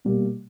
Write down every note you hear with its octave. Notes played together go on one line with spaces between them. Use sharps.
B2 G3 A#3